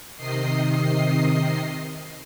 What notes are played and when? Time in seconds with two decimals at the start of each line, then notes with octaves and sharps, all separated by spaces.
0.17 C3 D#3 D#5 C7